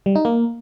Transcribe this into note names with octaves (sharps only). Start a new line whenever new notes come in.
G3
D#4
A#3